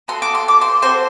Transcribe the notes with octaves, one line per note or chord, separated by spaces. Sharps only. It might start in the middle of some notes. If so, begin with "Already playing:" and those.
B3 F#4 A4 C6
D6
C6
D6
C5 C6
C4 F#4 A4 C5 C6